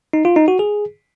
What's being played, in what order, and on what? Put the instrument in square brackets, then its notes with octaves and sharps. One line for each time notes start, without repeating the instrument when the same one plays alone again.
[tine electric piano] D#4
F4
D#4
F#4
G#4